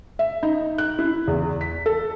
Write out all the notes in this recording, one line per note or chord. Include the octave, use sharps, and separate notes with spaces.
E5
D#4
F#6
E4
E2
B6
A4